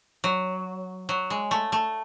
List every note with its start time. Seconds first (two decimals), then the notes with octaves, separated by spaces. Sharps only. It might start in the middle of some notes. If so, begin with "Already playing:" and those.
0.24 F#3
1.09 F#3
1.30 G#3
1.51 A3
1.72 A3